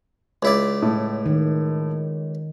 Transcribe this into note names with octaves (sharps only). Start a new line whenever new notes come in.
C#2 E4 D5
A2
D#3